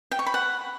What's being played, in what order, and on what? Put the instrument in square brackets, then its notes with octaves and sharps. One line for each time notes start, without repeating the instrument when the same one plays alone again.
[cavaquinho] G5
C#6
B5
F#5